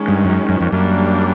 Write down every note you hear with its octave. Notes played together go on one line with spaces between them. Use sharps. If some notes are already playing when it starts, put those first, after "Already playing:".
Already playing: D#3 G#3 C#4
G2
F#2
F#2
F2
F#2 G3 A#3 D4